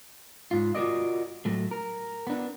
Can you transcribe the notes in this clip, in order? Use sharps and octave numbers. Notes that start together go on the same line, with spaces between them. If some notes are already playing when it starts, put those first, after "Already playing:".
G#2 F4
F4 F#4 A4 A#4 D5 D#5
A2 F#3 A3
A#4
B3 D4